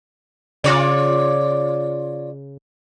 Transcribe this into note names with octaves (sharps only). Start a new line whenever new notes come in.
C#3 F4 C#5 D5